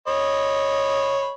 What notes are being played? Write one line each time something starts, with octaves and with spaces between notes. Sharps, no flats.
C#5 D#5 B5